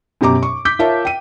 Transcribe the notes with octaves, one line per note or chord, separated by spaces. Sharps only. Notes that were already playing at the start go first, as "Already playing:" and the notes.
F#2 B2 G4 A#5 D6
C#6
D6 G6 B6
F4 A#4 C#5 E5 A5
G5 D#7